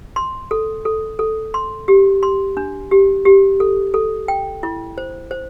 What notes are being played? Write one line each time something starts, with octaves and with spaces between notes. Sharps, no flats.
C6
A4
A4
A4
C6
G4
C6
D4
G4
G4
A4
A4
G5
E4
C5
C5